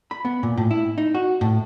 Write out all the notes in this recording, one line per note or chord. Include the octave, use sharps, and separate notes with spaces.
B5
B3
A#2
A2
E4
D#4
F#4
A2